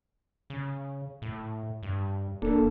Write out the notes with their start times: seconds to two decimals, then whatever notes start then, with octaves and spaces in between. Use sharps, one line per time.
0.50 C#3
1.22 A2
1.83 G2
2.42 D1 A#3 D4 A4